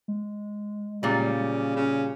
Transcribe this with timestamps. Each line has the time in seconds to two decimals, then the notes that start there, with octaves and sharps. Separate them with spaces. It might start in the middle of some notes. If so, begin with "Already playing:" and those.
0.08 G#3
1.03 A#2 C#3 G3
1.76 C#3